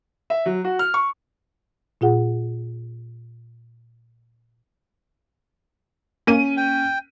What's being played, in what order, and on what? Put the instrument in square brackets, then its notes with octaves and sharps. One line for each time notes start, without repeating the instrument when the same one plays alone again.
[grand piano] E5
F#3
F#4
F6
C#6
[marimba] A#2 F4 G#4 F#5
[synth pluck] A#3 [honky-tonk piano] C#4 D#7
[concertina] G5